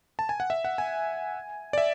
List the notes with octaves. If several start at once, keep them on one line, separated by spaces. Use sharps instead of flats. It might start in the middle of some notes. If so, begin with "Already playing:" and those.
A5
G#5
F#5
E5
F#5
G#5
D5
E5